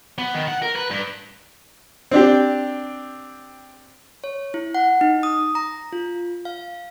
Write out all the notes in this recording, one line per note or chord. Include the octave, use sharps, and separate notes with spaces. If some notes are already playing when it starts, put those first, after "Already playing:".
B3
D#3
F#5
A#4
B4
G2
C4 D4 G4
C#5
E4
F#5
D#4
D#6
A#5
F4
F5